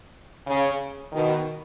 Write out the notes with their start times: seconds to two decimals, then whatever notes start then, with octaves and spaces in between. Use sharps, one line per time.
0.47 C#3
1.12 B2 D#3